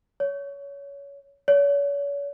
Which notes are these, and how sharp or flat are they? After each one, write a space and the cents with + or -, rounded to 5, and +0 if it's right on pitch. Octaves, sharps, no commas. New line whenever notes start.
C#5 +20
C#5 +40